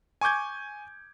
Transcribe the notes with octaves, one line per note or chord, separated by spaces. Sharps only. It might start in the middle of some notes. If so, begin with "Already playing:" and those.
G#5 C#6 D6 G6 G#6